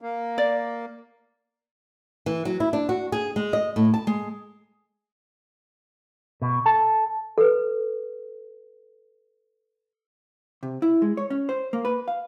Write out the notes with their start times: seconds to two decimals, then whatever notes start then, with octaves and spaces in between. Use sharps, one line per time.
0.02 A#3
0.38 D5
2.26 E3
2.45 F#3
2.60 E4
2.73 D4
2.89 F#4
3.12 G#4
3.36 G#3
3.53 D#5
3.76 A2
3.94 A5
4.07 G#3
6.42 B2
6.66 A4
7.38 A4 B4
10.63 C3
10.82 E4
11.02 G#3
11.17 C#5
11.30 C#4
11.49 C5
11.73 A#3
11.85 B4
12.08 F5